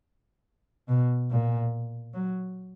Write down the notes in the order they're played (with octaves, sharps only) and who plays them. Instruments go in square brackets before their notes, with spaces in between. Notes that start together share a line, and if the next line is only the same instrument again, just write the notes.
[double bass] B2
A#2
F#3